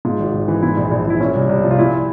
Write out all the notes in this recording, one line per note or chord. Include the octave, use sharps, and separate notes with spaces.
G#2 F4
G#1
G#1
E3
G#2 E4
A#1
A#1
E3 E4
A#2 C#4
C2
C2
F3
F4
A#2 E4